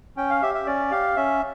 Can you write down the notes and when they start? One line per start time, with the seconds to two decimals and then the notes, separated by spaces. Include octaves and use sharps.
0.17 C#4 G5
0.30 F5
0.42 G4 E5
0.54 E5
0.67 C#4 D5
0.91 G4 F5
1.16 C#4 E5